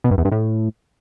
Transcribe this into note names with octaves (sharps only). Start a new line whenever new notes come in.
B2
G2
E2
G2
A2